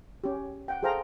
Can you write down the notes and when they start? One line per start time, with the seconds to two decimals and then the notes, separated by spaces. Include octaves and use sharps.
0.24 C#4 G4
0.68 F#5 G5
0.83 G#4 A4 C5 F5 G5 A#5